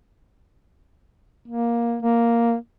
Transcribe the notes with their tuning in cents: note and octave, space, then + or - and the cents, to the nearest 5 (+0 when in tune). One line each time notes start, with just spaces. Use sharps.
A#3 +10
A#3 +0